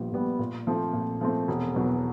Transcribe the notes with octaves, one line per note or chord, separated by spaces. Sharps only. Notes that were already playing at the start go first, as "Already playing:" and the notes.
Already playing: A#1 A#2 G3 B3
A#2 G3 B3
A#2
F3 A3 C4
A#2
F3 A3 C4
E1
E2 B2 F#3